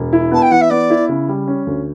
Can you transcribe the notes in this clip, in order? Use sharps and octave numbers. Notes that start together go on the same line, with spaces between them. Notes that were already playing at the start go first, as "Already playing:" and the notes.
Already playing: E1
E4
B3 A5
G5
E3 F#5
E5
B3 D5
E4
C#3
G3
C#4
D2